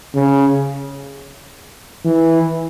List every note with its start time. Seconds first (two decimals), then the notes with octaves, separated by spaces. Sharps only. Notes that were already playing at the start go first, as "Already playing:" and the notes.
0.15 C#3
2.05 E3